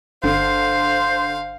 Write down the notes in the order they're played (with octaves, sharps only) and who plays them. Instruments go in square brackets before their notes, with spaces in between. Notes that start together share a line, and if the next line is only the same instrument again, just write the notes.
[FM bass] G1 [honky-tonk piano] D3 [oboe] C5 [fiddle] F5